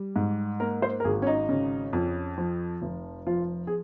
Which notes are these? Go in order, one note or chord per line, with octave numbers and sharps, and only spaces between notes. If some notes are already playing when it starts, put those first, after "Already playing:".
Already playing: G3
G#2
A#3 A#4
C5
A#4
G#1 G#4
C#4
D#4
C#3
F2
F3
F1
F3 F4
G#4